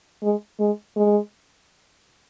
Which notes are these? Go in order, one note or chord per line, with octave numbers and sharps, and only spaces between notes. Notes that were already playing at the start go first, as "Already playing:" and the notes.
G#3
G#3
G#3